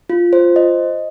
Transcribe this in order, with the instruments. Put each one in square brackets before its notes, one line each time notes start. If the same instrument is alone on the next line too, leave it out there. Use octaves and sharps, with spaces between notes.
[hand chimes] F4
C5
D#5